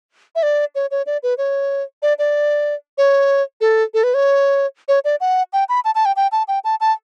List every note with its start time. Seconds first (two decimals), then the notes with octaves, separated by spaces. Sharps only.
0.35 E5
0.43 D5
0.75 C#5
0.91 C#5
1.06 D5
1.23 B4
1.38 C#5
2.02 D5
2.19 D5
2.98 C#5
3.61 A4
3.94 A4
4.04 B4
4.14 C#5
4.88 C#5
5.05 D5
5.21 F#5
5.53 G5
5.69 B5
5.85 A5
5.95 A5
6.05 G5
6.16 G5
6.32 A5
6.48 G5
6.64 A5
6.81 A5